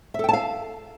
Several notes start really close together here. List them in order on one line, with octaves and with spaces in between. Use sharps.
E5 A4 G5 A5 F5